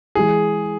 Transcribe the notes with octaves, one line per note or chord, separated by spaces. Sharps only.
E3 G#3 E4 G#4